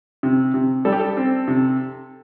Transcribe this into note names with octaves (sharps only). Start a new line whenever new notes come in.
C3
C3
G3 A4
G4
A4
C4
C3